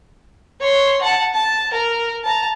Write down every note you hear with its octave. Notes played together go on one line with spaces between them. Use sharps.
C#5 C6
F#5 A5
A5
A#4
A5 A#5